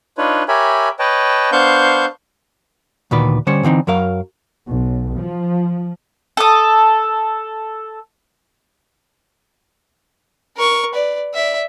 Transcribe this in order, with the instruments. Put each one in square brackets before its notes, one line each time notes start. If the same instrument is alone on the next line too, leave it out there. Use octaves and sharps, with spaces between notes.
[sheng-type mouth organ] D4 D#4 F4 B4 C#5
G4 A#4 C#5 E5 G#5 B5
B4 C#5 D#5 G5 A5
B3 D4 C5 F5 C#6 G6
[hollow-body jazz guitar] D2 A#2 D#3 B4 D5
D3 G3 C#4 C5 C#5
D3 E3 C4 D#4
F#2 F#3 A#4 F5
[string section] B1
F3
[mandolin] A4 D#6
[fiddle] A#4 C#6
B4 D5
D5 E5